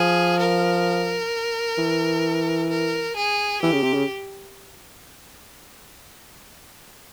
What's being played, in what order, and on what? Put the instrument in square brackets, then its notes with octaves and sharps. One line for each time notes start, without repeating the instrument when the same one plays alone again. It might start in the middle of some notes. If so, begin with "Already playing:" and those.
Already playing: [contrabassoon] F3 [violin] G#4
[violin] A#4
[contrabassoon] E3
[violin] A#4
G#4
[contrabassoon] E3 [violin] G4
[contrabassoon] C#3
C3
C#3